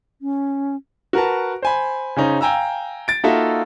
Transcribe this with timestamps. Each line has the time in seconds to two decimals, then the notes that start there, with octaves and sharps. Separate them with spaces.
0.22 C#4
1.13 F#4 A#4 B4 A5
1.62 C5 G#5 B5
2.16 C#3 C#4 D#4 C5
2.41 F5 G5 G#5 A#5 E6
3.08 A6 D7
3.23 A#3 D#4 F4 F#4 A4 E5